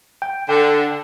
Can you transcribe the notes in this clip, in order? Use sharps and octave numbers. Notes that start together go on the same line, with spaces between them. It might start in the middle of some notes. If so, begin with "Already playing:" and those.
G5
D3 G5